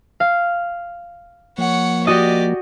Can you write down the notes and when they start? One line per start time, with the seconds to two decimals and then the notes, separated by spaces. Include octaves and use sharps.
0.20 F5
1.58 F3 A#3 C#5 F#5
2.07 F#4 G4 D5 D#5